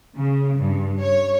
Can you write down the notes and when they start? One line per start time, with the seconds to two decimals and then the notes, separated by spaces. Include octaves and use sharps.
0.15 C#3
0.59 G2
1.01 C#5